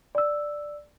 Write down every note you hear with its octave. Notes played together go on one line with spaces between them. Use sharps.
D5 E6